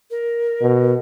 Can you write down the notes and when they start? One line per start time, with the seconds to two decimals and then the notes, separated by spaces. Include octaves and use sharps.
0.10 A#4
0.61 B2